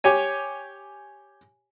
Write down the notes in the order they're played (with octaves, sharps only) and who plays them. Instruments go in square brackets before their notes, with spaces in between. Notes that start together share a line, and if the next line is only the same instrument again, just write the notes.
[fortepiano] G4 C#5 G#5